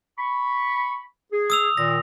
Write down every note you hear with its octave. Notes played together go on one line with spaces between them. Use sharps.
B5 C#6
G#4
D#6 E6 F7
A#2 D#3 A#6